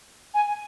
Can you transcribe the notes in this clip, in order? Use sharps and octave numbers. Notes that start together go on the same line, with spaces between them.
G#5